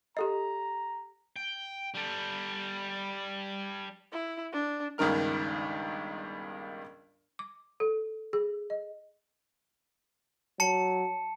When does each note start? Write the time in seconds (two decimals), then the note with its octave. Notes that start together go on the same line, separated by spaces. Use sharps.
0.17 G4 A4 D#5 A#5
1.36 G5
1.95 G3 A4
4.12 E4
4.53 D4
4.98 G1 C#2 G2 D#3 A#4 F6
7.39 D6
7.80 A4
8.33 G#4
8.70 D#5
10.60 F#3 A5 C#7